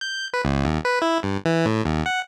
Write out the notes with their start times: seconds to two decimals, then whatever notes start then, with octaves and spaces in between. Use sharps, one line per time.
0.01 G6
0.34 B4
0.45 C#2
0.65 D#2
0.85 B4
1.02 E4
1.23 G2
1.45 E3
1.65 A2
1.85 D#2
2.06 F#5